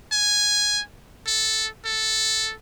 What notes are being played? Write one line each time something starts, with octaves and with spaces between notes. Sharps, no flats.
G#5
A4
A4